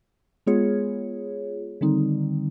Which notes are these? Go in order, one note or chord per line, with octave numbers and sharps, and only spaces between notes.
G#3 B3 F4 G#4 C#5
D3 D#3 G3 C4 D#4